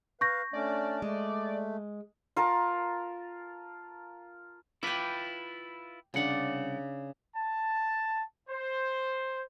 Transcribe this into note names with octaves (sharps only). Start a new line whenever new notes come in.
B4 F5 C#6 G6 A#6
A3 C#4 D4 D5
G#3 A3
F4 A#4 A5
E4 F4 B4 G5 D6
C2 C#3 D4 F#5
A5
C5